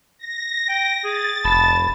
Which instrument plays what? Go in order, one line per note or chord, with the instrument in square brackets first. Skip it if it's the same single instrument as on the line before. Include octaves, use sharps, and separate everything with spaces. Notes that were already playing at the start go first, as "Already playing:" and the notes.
[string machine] A#6
[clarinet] G5
[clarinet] G#4 [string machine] A6
[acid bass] F1 [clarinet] A5 [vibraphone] B5